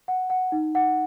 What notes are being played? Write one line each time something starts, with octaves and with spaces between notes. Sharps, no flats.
F#5
F#5
D#4
F#5